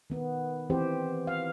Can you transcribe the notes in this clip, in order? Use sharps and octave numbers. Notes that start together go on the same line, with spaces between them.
D#3 B3
E3 C4 G4 C5
F5